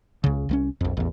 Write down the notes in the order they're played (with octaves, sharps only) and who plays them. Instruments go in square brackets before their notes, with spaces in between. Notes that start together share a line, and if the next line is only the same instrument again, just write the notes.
[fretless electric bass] C#2 C#3
C2 F#3 C#4
A#1 F2
A1 E2